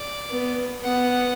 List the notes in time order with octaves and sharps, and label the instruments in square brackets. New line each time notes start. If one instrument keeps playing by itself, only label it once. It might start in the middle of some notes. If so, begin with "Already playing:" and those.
Already playing: [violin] D5
[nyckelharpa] B3
[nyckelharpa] B3 [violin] F#5